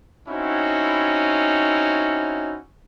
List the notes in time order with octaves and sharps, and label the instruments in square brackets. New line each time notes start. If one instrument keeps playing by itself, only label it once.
[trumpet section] C4 C#4 D#4 E4 F#4